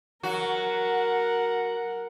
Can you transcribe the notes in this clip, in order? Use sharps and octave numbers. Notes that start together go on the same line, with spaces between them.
F#3 F#4 A#4 F#5